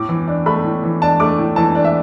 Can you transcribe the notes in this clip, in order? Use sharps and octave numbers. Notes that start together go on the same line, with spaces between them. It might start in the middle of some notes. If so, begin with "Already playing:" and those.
Already playing: A2 D6
E3
D4
A3 B5
A2
E3
D4 A5
A3 D6
A2
E3 A5
D4
E5